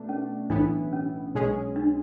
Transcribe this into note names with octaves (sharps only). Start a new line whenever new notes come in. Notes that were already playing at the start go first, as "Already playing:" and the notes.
Already playing: B2 A3 D4
C#4
B1 A2 E3 B3 D4 E4
C#4
B1 B2 G#3 C#4 G#4
D4